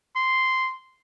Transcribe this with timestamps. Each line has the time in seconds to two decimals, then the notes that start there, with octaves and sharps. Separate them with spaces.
0.16 C6